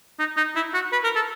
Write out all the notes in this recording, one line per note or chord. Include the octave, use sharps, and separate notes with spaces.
D#4
D#4
E4
F#4
B4
A#4
A4